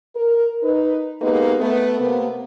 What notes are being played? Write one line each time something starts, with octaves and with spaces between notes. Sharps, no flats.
A#4
D#4 B4
G#3 A#3 B3 D#4 G4 B4
A3 B3
C3 A#3 B3